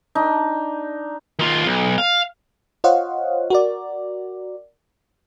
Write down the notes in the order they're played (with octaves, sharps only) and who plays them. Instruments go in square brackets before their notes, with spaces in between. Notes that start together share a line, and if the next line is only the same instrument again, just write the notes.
[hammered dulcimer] D4 D#4
[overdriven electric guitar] D#3 F4
B1
F5
[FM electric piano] F4 C5 C#5 D#5 F5 F#5
F#4 A#4 D5